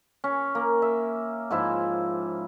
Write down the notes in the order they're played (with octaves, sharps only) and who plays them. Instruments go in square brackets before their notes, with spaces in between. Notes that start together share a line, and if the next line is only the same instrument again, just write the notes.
[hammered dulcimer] C#4
A#3
E5
G#2 F3 E4